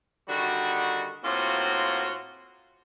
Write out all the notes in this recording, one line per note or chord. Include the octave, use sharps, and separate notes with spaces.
D3 D#3 G3 F#4
A2 A#3 C4 F4 F#4